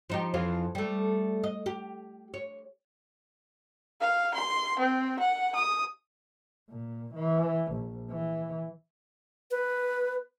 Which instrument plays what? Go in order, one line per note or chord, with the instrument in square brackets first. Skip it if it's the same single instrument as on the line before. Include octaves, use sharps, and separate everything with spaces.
[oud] F3 D#4 G4
F2 E3 F4
G3 A3
D#5
G4
C#5
[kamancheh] F5
C6
C4
F#5
D#6
[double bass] A#2
E3
A#1
E3
[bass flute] B4